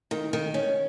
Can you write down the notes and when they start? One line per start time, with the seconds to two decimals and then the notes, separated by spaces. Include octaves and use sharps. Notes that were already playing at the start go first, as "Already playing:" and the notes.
0.11 D#3
0.33 D#3
0.54 C#4